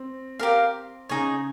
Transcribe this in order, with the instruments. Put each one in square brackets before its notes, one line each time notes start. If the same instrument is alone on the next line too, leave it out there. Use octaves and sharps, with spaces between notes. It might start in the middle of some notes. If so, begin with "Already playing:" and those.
Already playing: [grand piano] C4
[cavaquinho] G4 A#4 F5
[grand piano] C#3 [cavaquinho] D#4 G#4 C#5